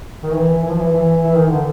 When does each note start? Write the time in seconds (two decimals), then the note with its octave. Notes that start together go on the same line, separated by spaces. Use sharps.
0.23 D#3
0.31 E3
0.62 E3
0.68 F3
0.76 E3
0.92 E3
1.23 E3
1.35 D#3
1.47 D3